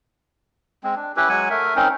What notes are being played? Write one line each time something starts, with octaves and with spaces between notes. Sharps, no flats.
G#3 C4
D4
C#4 E4 G4 B4
F#3 G#3 F#5 G#5
A3 A#4 E5
C4 C#4 D#4 A#4